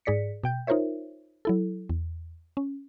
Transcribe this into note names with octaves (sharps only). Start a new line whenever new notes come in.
G#2 G#4 D5 B6 C#7
B2 G5 G6
D#4 F4 A#4 C5 C#5 E5
F#3 E4 A4
E2
C#4